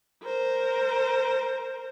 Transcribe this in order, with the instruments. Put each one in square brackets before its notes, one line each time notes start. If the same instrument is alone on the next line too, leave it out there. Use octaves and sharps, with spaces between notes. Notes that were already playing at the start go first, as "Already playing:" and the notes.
[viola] A#4 C5